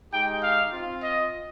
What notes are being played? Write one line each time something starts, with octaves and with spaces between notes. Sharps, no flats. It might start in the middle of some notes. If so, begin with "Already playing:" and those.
G#3 D#4 G4 G5
F5
C4 F4
D#5